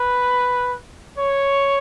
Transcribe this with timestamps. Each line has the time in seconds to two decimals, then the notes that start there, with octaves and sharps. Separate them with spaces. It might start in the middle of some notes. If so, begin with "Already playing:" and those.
Already playing: B4
1.18 C#5